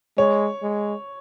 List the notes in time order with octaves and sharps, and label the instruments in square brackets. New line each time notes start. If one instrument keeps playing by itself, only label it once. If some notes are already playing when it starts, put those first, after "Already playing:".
[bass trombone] G#3 [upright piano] C#5
[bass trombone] G#3